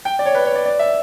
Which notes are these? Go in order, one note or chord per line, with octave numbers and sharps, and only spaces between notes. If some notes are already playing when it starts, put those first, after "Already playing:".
G5
D5
C#5
B4
C#5
D5
D5
E5